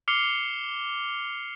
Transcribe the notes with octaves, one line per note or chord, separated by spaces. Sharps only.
D6 F6 C7 C#7 F7 G7